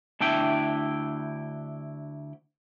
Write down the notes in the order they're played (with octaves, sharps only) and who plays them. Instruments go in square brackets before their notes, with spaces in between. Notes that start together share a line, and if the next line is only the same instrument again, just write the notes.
[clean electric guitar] D2 D4 E4 G5